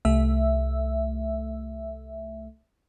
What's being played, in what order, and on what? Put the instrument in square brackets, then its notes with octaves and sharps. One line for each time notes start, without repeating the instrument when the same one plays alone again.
[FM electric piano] C2 A3 E5